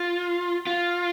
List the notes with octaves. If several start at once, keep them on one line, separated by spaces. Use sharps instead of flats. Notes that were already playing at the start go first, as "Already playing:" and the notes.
Already playing: F4
F4